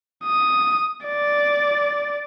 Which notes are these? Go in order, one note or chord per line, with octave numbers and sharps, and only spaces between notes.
D#6
D5